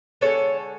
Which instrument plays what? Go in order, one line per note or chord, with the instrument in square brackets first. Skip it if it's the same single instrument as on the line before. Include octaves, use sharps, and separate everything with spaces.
[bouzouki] D3 G#3 B3 A4 C#5